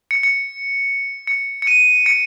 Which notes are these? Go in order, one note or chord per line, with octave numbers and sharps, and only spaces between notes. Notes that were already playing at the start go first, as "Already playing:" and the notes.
C#7
C#7
C#7
C#7
D#7
C#7